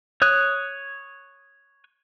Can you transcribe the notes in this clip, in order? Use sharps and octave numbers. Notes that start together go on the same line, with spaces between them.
C#5 D#6 F#6